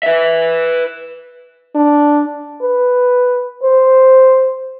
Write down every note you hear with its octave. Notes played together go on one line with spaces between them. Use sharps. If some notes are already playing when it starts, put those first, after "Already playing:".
B4 E5
D4
B4
C5